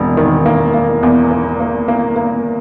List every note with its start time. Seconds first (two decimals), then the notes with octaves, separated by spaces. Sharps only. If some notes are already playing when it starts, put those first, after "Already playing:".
Already playing: E1
0.17 D#3
0.46 A#3
0.74 A#3
1.03 E2
1.31 A#3
1.60 A#3
1.88 A#3
2.16 A#3